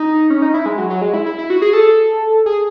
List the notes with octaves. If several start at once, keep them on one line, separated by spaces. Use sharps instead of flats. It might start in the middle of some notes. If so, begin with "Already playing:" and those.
Already playing: D#4
C#4
D#4
E4
G#3
F#3
F#3
G#3
E4
E4
E4
F#4
G#4
A4
G#4